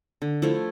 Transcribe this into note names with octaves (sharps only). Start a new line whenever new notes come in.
D3
F3 A3 E4